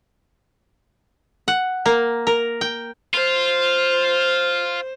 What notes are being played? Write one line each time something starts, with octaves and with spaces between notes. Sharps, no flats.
F#5
A#3
A#4
G5
F4 C5